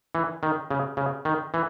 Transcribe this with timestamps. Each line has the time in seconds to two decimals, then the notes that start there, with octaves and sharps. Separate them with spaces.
0.15 E3
0.43 D#3
0.71 C#3
0.97 C#3
1.25 D#3
1.54 E3